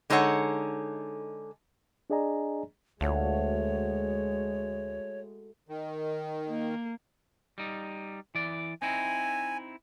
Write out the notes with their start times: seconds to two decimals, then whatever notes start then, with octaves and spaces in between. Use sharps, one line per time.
0.10 D3 G#3 D#4 A4 C#5 F#5
2.10 D4 G#4 D5 D#5 G#5 A#5
3.01 D2 G#3 A3 F#4 C#5 F5
5.69 D#3
6.48 A#3
7.58 G3 D#4
8.35 E3 D5
8.82 C4 D#4 E4 G#5